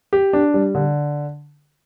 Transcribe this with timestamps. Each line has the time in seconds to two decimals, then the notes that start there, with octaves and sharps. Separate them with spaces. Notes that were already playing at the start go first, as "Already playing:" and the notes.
0.13 G4
0.33 D4
0.54 G3
0.75 D3